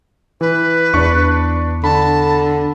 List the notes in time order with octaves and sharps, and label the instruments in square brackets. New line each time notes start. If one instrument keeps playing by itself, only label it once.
[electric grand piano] E3 [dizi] B4
[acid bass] E2 [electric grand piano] D4 C#6
[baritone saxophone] D3 [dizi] A5 [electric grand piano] B5